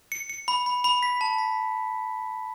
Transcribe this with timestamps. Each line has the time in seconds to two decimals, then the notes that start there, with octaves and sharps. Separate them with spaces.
0.12 C#7
0.30 C#7
0.48 B5
0.66 B5
0.84 B5
1.03 B6
1.21 A5
1.38 B6